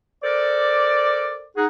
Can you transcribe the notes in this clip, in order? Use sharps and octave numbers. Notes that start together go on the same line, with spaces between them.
A4 A#4 C5 D5
D#4 G#4 F#5